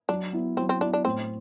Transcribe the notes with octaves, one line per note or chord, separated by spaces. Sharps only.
F#3 D4
B3 E4
F#3 C4
C4
B3 D4 E4
D4
A2 C4